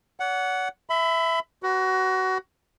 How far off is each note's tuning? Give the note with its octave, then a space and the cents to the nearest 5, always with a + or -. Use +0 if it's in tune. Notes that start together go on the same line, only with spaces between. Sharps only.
C#5 +45 F#5 +0
E5 +0 B5 +30
F#4 +25 B4 +0